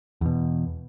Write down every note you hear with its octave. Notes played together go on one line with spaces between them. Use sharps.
E2 B2